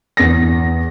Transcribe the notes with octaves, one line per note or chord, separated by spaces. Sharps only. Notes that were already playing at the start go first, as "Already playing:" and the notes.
E2 A#6